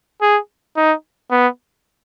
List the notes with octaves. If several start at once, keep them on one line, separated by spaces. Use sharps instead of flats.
G#4
D#4
B3